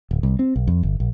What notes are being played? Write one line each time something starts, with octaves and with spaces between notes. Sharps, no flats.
D1
C2
C4
B1
F2
G1
A#1